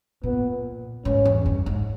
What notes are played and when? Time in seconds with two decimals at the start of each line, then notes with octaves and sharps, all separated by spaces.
0.23 A#2 B3
1.05 G#2 C#4
1.25 E2
1.46 G2
1.66 G#2